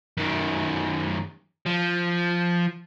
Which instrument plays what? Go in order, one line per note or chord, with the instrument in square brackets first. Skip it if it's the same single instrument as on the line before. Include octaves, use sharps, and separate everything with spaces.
[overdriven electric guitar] F#2 D#3
F3